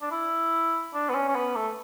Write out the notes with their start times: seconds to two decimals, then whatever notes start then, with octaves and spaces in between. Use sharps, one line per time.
0.01 D4
0.11 E4
0.94 D4
1.09 B3
1.15 C#4
1.28 C#4
1.35 B3
1.56 A3